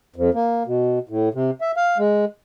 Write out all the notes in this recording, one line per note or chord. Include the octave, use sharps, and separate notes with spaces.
F2
A#3
B2
A2
C3
E5
F5
G#3